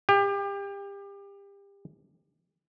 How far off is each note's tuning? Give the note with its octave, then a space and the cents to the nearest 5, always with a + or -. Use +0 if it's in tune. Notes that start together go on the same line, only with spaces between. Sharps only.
G4 +30